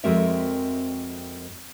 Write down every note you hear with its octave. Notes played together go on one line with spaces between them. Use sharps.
F2 G#3 C4 F#4 A#4 E5